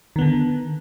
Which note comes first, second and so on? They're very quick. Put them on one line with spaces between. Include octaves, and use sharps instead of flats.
D#3 B3 D3